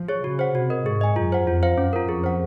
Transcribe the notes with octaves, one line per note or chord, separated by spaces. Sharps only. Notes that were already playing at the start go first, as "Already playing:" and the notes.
Already playing: F3
G#4 C#5
C#3 F#4
C5 F#5
C3 F#4
A#4 D#5
G#2 G#4
D#5 G#5
F#2 F4
C5 F#5
F2 F4
C5 F5
F#2 C#4
F4 A#4
F2 G#4
C5 F#5